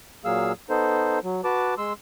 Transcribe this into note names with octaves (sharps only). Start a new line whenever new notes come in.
A#2 F#3 A#3 G#4 F5 E6
B3 D#4 A4 C5
F#3
F#4 B4 A5 D6
G#3 C6 E6